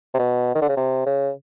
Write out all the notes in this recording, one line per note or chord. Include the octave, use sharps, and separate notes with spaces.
C3
B2
D#3
D3
C#3
C3
C#3